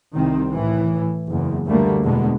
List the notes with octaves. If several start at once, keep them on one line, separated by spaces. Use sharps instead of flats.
C2 D#3 C4
A2 E3
F#1 E2
D2 D3 G3 A3 A#3
E2 B2 D3 G#3